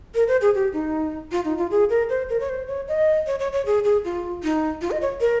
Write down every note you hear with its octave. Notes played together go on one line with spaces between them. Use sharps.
A#4
C5
G#4
G4
D#4
F4
D#4
F4
G#4
A#4
C5
A#4
C#5
C5
C#5
D#5
C#5
C#5
C#5
G#4
G#4
F4
D#4
F4
D#5
C#5
A#4